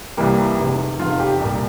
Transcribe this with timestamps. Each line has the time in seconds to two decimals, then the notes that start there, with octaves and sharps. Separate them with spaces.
0.17 C2 C3 E3 G3 A#3 G4
0.58 F1 E2 C3
0.99 F1 E2 C3 F4
1.20 G4
1.40 C2 A#2 G3 A#3